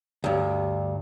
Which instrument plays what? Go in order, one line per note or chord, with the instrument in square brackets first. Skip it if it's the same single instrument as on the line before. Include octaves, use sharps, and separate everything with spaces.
[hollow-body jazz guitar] D2 G2